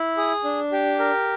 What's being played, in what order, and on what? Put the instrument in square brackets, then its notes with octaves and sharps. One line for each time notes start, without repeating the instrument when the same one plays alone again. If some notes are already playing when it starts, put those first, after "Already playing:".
Already playing: [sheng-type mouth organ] E4
G#4
D4
G4
A#4